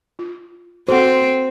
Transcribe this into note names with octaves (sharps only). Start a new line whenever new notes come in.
F4
C4 F#4 A4 C5 F#5